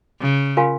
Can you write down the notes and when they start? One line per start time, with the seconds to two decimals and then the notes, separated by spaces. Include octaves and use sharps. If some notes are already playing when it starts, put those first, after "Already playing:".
0.21 C#3
0.57 F4 A#4 F5 G#5 C6